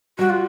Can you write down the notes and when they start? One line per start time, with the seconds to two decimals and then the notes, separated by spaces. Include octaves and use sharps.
0.19 G3 F#4
0.30 F4